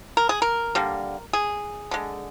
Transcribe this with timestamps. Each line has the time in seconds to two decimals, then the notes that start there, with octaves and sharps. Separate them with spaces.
0.17 A#4
0.29 G#4
0.42 A#4
0.75 D3 G3 A#3
1.33 G#4
1.91 D3 G#3